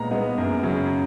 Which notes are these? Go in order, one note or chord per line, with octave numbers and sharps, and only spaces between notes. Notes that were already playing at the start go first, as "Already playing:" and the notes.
Already playing: A#2 G#3 B3 A#5
G#3 B3
F#2
C#3 F#3